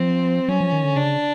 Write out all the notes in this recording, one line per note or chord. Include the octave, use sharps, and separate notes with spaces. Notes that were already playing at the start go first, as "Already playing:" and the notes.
Already playing: F3 C4
F#3 C#4
F3
D#3
D3
C#3 D4